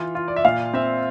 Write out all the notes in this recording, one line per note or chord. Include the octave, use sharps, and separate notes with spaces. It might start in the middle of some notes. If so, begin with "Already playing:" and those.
Already playing: E3 F4
F4
D5
E5
A#2 F5
C4 E5